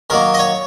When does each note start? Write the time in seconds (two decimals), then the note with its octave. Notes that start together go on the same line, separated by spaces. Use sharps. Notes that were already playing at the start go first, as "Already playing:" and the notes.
0.10 D#3 F#3 A#3 A#4
0.34 D#5
0.39 C#5